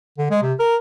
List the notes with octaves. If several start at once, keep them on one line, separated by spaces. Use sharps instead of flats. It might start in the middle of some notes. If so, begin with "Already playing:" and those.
D3
G#3
C3
A#4